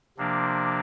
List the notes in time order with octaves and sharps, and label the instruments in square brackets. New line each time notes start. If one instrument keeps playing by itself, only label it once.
[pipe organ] C3 F3 A#3 D4